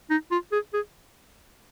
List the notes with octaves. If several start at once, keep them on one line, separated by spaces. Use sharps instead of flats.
D#4
F4
G#4
G#4